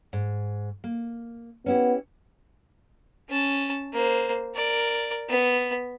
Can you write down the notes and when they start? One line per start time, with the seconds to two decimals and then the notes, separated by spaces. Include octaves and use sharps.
0.13 G#2
0.84 A#3
1.66 B3 C#4 E4 G4
3.29 C#4 A5
3.93 A#3 C5
4.55 A#4 D5
5.29 B3